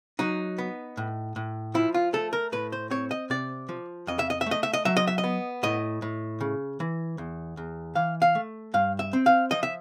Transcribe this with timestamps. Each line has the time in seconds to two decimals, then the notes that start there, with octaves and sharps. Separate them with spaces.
0.19 F#3 D#4
0.58 B3
0.97 A2
1.36 A2
1.74 F3 E4
1.94 F4
2.13 A3 A4
2.33 A#4
2.52 A2 B4
2.72 C5
2.90 C4 C#5
3.11 D#5
3.30 C3 D5
3.69 F3
4.07 F2 D#5
4.19 E5
4.30 D#5
4.41 E5
4.46 A3 D#5
4.63 E5
4.74 D#5
4.85 F#3 E5
4.97 D#5
5.07 E5
5.18 D#5
5.24 B3
5.63 A2 D#5
6.02 A2
6.41 C#3
6.80 E3
7.18 E2
7.57 E2
7.95 E3 F5
8.22 F5
8.35 A3
8.74 G2 F5
8.99 E5
9.13 C4
9.26 F5
9.51 F3 D#5
9.63 E5